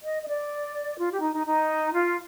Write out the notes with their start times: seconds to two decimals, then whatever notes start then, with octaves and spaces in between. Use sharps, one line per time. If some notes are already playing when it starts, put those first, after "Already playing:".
0.03 D#5
0.22 D#5
0.28 D5
0.98 F4
1.10 G4
1.22 D#4
1.34 D#4
1.46 D#4
1.93 F4